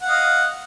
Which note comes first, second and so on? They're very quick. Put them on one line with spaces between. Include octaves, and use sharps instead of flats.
F#5 F5 D#5